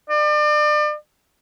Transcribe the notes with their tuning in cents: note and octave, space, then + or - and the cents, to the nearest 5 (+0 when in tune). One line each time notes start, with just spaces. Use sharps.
D5 +35